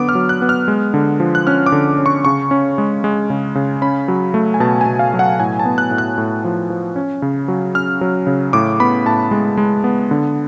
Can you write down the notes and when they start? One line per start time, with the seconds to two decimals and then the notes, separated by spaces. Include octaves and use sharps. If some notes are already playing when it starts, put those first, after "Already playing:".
Already playing: D3 F#3 B3 D6
0.09 F6
0.15 F#3
0.29 F#6
0.42 B3
0.49 F6
0.68 G#3
0.94 D3
1.20 F3
1.35 F#6
1.47 C#4 F6
1.66 D6
1.72 D3
1.98 C#4
2.06 C#6
2.25 C#3 C#6
2.51 C#4
2.78 G#3
3.04 G#3
3.30 C#3
3.55 C#3
3.82 C#4 B5
4.08 F#3
4.34 A3
4.54 G#5
4.60 B2 A5
4.81 G#5
4.86 B2
4.99 F5
5.14 F#3
5.19 F#5
5.40 A2 G#5
5.59 A5
5.65 B3
5.78 F#6
5.91 A2
5.98 F#6
6.18 A2
6.45 F3
6.70 F3
6.96 C#4
7.22 C#3
7.48 F#3
7.74 C#4 F6
8.01 F#3
8.27 C#3
8.53 A2 D6
8.80 B3 B5
9.05 A2 A5
9.31 G#3
9.57 G#3
9.84 B3
10.11 D3